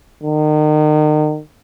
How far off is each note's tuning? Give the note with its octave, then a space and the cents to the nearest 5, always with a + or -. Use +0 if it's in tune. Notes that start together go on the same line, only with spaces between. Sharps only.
D#3 -35